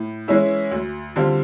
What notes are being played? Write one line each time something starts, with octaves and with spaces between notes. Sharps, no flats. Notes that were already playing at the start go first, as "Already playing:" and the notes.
Already playing: A2
E3 G#3 C#4 E4
D2
D3 G3 C4 F4